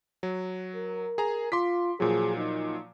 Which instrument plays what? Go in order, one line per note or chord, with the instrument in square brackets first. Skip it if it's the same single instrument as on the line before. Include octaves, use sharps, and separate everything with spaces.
[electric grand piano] F#3
[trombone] A#4
[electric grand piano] G#4 A#5
[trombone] F4 [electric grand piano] C6 D6 B6
[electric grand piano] A#2 F3 F#3 [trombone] G#4
[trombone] D#4